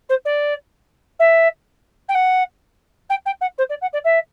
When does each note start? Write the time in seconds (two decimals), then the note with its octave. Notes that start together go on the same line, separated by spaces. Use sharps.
0.09 C5
0.25 D5
1.19 E5
2.08 G5
2.14 F#5
3.09 G5
3.25 G5
3.41 F#5
3.58 C5
3.69 D5
3.81 F#5
3.93 D5
4.04 E5